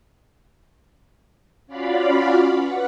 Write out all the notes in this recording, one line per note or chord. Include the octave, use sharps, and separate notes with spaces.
C#4 F4 F#4 D5 F5 B5
B4 F#5